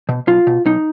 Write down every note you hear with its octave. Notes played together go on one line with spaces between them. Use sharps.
B2
B1 F4
B2
B1 D#4